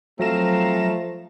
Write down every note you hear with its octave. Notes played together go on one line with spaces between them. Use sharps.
F3 F#3 A3 C4 F5 A#5 A#6 E7